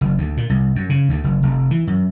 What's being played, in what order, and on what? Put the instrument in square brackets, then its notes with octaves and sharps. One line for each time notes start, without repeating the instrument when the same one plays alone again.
[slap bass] F#1
D2
A#2
C2
F#2
C#3
D2
F#1
F1
E3
F#2